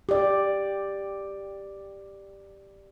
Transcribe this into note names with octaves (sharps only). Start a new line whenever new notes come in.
G4 D5